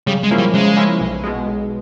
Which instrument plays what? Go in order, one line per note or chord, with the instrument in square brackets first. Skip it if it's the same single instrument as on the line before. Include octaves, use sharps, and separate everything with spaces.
[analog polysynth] C#3 [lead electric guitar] G3
[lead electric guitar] G#3
[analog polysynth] F3 A#3 C#4 E4
[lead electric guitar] G3
[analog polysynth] C#3 [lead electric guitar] G#3
[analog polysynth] F3 A#3 C#4 E4
B1
B2 G#3
B1